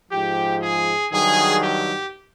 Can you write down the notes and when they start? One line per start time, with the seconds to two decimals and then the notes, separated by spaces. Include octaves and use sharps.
0.11 G#2 F3 G4
0.62 G#4
1.12 G2 D#3 F#3 G#4
1.63 G4